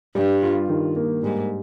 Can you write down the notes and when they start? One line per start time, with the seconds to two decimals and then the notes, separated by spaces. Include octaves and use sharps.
0.15 G2 G3
0.42 F4
0.69 D#3
0.96 A#3
1.23 G#2 G3